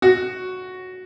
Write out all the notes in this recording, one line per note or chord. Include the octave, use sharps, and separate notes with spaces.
F#4